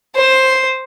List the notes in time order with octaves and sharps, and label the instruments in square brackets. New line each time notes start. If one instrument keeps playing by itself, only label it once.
[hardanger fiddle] C5